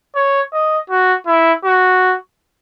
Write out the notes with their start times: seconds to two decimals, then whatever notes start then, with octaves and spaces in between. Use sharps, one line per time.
0.15 C#5
0.53 D#5
0.90 F#4
1.27 E4
1.65 F#4